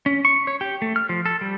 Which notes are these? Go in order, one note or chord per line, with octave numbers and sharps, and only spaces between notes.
C#4
C#6
C#5
G4
A3
F6
F3
A4
G3